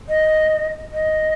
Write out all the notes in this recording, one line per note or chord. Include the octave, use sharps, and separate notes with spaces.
D#5
D#5